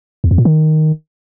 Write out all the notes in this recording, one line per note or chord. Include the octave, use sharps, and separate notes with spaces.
E2
F2
A#2
D#3